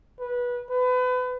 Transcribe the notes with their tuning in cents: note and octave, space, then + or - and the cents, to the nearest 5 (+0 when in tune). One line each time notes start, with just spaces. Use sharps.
B4 -20
B4 +30